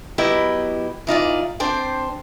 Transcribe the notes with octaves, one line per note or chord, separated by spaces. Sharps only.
F#3 B3 E4 G4 D#5 G5
E3 D#4 F4 D5
C4 D4 C5 G5